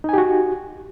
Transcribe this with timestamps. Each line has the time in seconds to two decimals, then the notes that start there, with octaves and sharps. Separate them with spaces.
0.04 D#4
0.09 G#5
0.13 G4
0.18 F#4